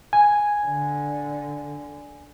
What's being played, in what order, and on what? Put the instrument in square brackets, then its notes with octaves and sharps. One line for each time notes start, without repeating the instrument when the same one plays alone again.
[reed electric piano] G#5
[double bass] D3